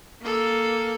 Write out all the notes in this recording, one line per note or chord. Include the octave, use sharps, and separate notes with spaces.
A#3 A4